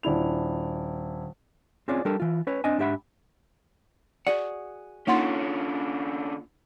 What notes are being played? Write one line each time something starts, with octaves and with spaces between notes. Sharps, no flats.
D#1 D4 E4 F7
C4 C#4 F4 G#4 C#5 D5
G3 D4 G4 A4 A#4
E3 F4
C#4 B4 C#5
C4 D4 D#5 G#5
G#2 D4 G4 E5 F#5 B5
F#4 G#4 D5 F#5
D3 A#3 C#4 D#4 F4 F#5 C6